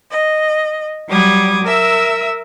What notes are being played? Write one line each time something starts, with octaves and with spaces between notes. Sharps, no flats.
D#5
F#3 G3 D6 D#6 G#6
A#4 E5 E6